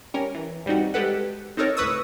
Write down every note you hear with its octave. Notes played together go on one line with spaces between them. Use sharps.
G3 C#4 A#4
E3
G2 G3 C4 D#4 F#4
G#3 G4 A4 B4 F#5
C4 D#4 A4 A#4 C#5
C#2 A2 B4 C#6 D#6 E6